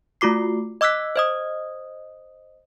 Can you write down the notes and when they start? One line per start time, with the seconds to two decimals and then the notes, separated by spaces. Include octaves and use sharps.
0.21 A3 F4 F#4 D6 C7
0.81 D#5 D6 E6 F#6 B6
1.16 C5 D#5 D#6